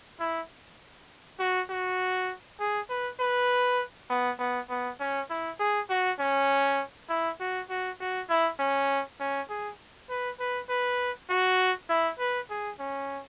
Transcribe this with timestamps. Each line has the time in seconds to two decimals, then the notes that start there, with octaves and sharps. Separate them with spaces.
0.20 E4
1.39 F#4
1.70 F#4
2.60 G#4
2.89 B4
3.20 B4
4.10 B3
4.39 B3
4.70 B3
5.00 C#4
5.30 E4
5.59 G#4
5.90 F#4
6.20 C#4
7.09 E4
7.40 F#4
7.69 F#4
8.00 F#4
8.29 E4
8.59 C#4
9.20 C#4
9.49 G#4
10.09 B4
10.40 B4
10.69 B4
11.29 F#4
11.90 E4
12.19 B4
12.50 G#4
12.79 C#4